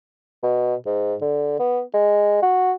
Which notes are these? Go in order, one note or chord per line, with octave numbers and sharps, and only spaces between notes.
B2
G#2
D3
B3
G#3
F#4